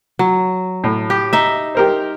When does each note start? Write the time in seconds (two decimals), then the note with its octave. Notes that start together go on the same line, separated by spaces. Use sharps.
0.19 F#3
0.84 A2
1.10 G4
1.33 D#4 E5
1.75 G4 A#4 C5